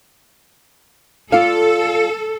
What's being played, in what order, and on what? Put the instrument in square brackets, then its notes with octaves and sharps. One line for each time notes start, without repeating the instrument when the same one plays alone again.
[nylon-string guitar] F4 D5 F5 [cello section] A4